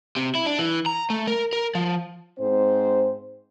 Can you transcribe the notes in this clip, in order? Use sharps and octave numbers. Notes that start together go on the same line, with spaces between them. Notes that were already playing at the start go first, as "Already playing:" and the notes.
C3
E4
D4
E3
A#5
A3
A#4
A#4
F3
G#2 C4 C5